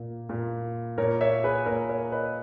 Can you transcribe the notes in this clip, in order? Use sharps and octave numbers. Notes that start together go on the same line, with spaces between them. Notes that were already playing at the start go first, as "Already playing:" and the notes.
Already playing: A#2 A#3
A#2 A#3
A#2 A#3 A#4 C#5
C#5 E5
G#4 B4
A#2 A#3 A#4 C#5
A#4 C#5
B4 D#5